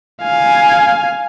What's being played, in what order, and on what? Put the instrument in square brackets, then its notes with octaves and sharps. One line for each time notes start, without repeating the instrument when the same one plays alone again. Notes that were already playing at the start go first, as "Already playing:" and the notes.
[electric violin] F5 G#5